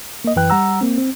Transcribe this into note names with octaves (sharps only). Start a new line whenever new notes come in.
A#3 D#5
F#2 E3 B4 G5 F#6
G3 F#5 A#5 E6
A#3 C4
C4